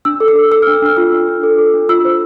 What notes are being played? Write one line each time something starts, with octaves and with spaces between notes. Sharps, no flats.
D4 E6
A4
E6
A4
A4 E6
F6
D4
E6
D4 F6
F4 E6
D4
D4
A4
A4
D4
F4 E6
C5